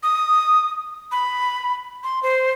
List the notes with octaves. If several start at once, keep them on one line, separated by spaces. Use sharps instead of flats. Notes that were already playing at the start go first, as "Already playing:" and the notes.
D#6
B5
C6
C5